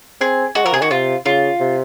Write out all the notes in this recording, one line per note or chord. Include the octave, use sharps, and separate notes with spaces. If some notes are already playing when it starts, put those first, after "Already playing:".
C4 G#4
G#3 F#4
F3 A#4
C3 G#4
D#3 F#4
C3 F4
C#3 F4
C3